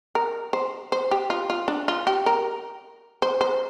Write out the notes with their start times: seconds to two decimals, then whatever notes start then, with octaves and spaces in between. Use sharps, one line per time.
0.15 A#4
0.53 C5
0.92 C5
1.11 G4
1.30 F4
1.50 F4
1.68 D4
1.88 F4
2.07 G4
2.26 A#4
3.22 C5
3.41 C5